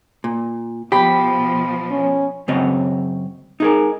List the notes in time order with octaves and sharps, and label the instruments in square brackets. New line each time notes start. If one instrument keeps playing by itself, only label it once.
[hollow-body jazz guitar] A#2
[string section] B2 F3 [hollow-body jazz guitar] G4 [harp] B5 B6
[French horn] C#4
[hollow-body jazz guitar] F#2 C#3 C4 C#5 D#5
D#4 G#4 A#4